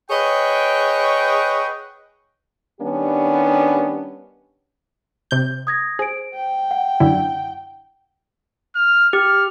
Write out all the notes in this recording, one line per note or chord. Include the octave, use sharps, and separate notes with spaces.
G#4 B4 C#5 D#5 F#5 G5
D#3 G3 B3 C#4 D4 G4
C3 G6
D#6 G#6 A#6
G#4 C5 D7
G5
F#5
F#2 D3 E4
F6
G4 F6